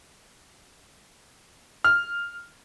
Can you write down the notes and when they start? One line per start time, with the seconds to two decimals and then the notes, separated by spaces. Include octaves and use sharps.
1.84 F6